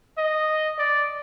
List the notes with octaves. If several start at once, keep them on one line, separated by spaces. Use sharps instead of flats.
D#5
D5